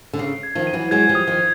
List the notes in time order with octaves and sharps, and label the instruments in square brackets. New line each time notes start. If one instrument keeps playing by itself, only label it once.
[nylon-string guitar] D3
[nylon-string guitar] C#3 [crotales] C7
[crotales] G#6
[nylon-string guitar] D#3 F3
[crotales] D#7
[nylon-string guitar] E3 F#3
[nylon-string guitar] F#3 G#3 [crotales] G#6
[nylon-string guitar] F3 G3
[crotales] D#6
[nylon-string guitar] D#3 F3